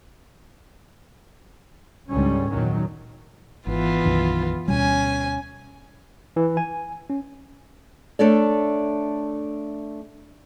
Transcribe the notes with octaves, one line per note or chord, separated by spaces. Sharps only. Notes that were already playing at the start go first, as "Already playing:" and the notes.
C#2 G#2 D3 G3 C#4
E2 A#2 D#3 F#3
G#1 E3 B3 F4
B1 F#2 D#3
D2 B2 G3 C#4 G#5
E3
G#5
C#4
A3 D4 A4 C#5 D5